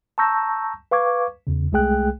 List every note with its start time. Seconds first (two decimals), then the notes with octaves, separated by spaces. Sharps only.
0.18 A5 A#5 C#6 E6 G6 A#6
0.91 B4 F5 C#6 D6 G#6
1.47 E2 C#3
1.72 C2 G#3 A3 G#4 G5 F#6